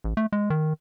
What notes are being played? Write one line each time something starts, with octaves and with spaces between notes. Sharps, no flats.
A1
A3
G#3
D#3